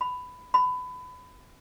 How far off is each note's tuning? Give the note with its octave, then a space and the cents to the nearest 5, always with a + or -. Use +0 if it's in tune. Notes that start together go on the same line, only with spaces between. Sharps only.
B5 +15
B5 +25